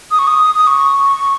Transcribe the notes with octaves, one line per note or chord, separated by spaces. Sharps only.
D#6
C#6
D#6
D#6
C#6